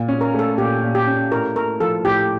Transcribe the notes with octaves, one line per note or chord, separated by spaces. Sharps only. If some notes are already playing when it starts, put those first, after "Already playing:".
Already playing: A#2
C#4
A#4
A3
A4
A#2 G4
A#2
G4
C#4
A2 A#4
A3 A#4
F3 A4
A2 G4